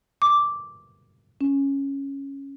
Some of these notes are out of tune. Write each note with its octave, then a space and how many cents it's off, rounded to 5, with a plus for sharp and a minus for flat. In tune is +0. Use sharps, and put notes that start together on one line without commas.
D6 -5
C#4 -5